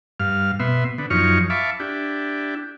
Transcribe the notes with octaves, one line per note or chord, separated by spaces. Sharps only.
G2 F5 F6
B2 B3 E5 C6
D3 B3
F#2 F3 D#4 C#5 C#6 F6
E5 F5 A5 B5 C#6 D6
D4 E4 G4